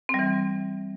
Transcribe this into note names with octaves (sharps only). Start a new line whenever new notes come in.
E3 G3 C4